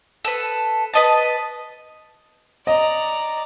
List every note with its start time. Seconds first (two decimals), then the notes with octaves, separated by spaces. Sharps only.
0.25 A4 B4
0.94 B4 D#5 A5
2.67 D5 D#5 A#5